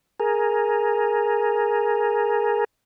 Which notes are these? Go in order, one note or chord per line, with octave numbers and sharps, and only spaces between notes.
G#4 A#4